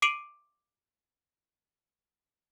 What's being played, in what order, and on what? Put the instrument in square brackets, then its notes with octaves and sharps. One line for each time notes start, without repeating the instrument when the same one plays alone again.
[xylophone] D6 C7 D7 D#7 F7 F#7